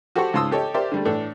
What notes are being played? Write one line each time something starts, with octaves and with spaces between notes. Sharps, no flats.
F#4 G4 A4 C5 F#5 C#6
C#2 G#2 A5 C6 D#6 E6
G4 A4 C#5 D#5 G5
G4 A#4 C5 D5 E5
D3 G3 A3
A2 E3 D4 A4